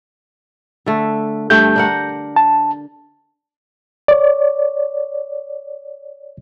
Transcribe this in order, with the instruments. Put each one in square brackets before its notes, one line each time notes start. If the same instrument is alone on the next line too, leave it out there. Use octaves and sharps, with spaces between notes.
[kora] D3 A3
[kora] G2 A3 G5 [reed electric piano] G6
[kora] D4 A#4 F#5
[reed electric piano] A5
C#5 D5